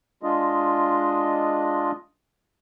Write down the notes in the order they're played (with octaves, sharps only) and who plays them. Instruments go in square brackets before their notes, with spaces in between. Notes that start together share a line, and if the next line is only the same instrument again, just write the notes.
[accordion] G#3 D4 F4 D#5